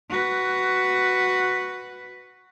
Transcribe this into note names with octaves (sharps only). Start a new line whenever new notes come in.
F#4 B4